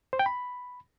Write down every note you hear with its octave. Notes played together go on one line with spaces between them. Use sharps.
C5
G5
B5